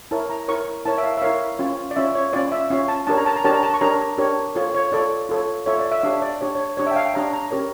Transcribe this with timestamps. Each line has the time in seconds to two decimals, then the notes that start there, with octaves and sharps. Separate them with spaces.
0.11 E4 A#4 C#5 A5
0.30 A#5
0.48 E4 A#4 C#5 C#6
0.85 E4 A#4 C#5 A5
0.98 E5
1.03 F5
1.17 E5
1.22 E4 A#4 C#5 F5
1.59 C#4 F4 C#5
1.91 D5
1.96 C#4 F4 C#5 E5
2.15 C#5
2.33 C#4 F4 C#5 D5
2.52 E5
2.70 C#4 F4 C#5 F5
2.88 A5
3.07 D4 G4 A#4 C#5 A5
3.17 A#5
3.26 A5
3.36 A#5
3.44 D4 G4 A#4 C#5 A5
3.54 A#5
3.63 A5
3.74 C#6
3.81 D4 G4 A#4 C#5 A#5
4.18 D4 G4 A#4 C#5
4.55 F4 A4 C#5
4.75 C#5
4.92 F4 A4 C#5 D5
5.29 F4 A4 C#5
5.66 F4 A4 C#5 E5
5.79 D5
5.91 E5
6.03 D4 G4 C#5 F5
6.22 D5
6.41 D4 G4 C#5
6.55 C#5
6.77 D4 G4 C#5
6.87 E5
6.91 G5
6.96 F5
7.06 G5
7.14 D4 G4 C#5 A#5
7.33 A#5
7.51 C#4 G4 A#4 C#5